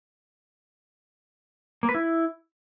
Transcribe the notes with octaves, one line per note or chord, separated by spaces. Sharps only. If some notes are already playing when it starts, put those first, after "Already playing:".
A#3
B4
E4